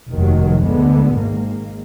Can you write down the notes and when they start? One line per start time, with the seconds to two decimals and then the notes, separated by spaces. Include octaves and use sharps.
0.10 F1 D#2 D#3 F#3
0.62 D2 D3 G#3 B3
1.13 G#1 G#2 D#3 A#3